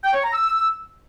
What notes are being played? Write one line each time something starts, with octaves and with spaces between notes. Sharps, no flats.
G5
C#5
A#5
E6